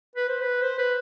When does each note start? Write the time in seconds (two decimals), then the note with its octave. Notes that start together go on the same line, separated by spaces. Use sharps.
0.16 B4
0.29 C5
0.41 B4
0.62 C5
0.78 B4